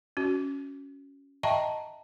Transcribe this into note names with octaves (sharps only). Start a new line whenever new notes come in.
C#4 F#4
D#5 E5 G5 A5 A#5 C#6